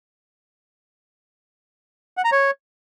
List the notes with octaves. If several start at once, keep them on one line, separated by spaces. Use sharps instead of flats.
F#5
A#5
C#5